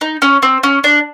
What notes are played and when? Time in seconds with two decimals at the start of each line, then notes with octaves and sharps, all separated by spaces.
0.01 D#4
0.22 C#4
0.42 C4
0.63 C#4
0.84 D4